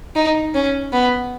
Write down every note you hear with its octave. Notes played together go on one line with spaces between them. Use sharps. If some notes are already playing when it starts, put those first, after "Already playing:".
D#4
C#4
B3